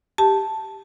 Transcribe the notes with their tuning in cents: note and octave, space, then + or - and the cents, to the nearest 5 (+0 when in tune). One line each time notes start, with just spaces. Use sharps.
G4 +0 A5 +0